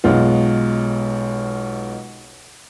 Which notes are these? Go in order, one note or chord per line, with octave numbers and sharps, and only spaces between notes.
B1 B2 G#3 B3 F4